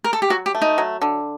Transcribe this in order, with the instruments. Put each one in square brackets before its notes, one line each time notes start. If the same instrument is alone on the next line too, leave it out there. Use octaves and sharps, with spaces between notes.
[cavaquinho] A#4
A4
G4
[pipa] F#3 [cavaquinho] F#4
[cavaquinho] G4
[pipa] A3
[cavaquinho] D#4
[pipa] F#3
D3